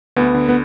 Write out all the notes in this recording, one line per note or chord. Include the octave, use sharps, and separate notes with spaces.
D2 B3
D3
B3